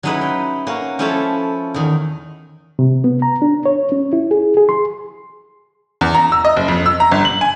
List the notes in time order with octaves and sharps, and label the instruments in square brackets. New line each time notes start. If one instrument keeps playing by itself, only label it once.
[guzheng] F#3 G#3 C#4 D#4 E4 B4
G5
A#3 C#4 F#4
F3 C#4 E4 F4 A4 E5
E2 D#3
[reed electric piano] C3
B3
A#5
D4
C#5
C#4
E4
G#4
G#4
C6
[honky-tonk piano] E2
A#5
E6
D#5
F#1
F2
E6
A#5
G1
F#7
G#5